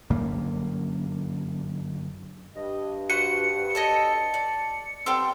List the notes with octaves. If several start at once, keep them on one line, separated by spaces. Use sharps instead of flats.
G1 F#2 A#3
G2 D#5
F#4 B4 C5 F#5 C#7
A4 C#5 D#5 A5
D5
G3 B3 C4 A4 F5 G5 C6